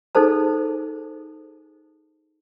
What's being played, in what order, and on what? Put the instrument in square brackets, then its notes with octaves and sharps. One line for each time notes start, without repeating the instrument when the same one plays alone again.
[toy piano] D#4 G#4 A4 C5 A5